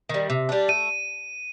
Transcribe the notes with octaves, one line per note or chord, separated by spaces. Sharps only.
D#3 G3
C3
G3 D4
A3 D#7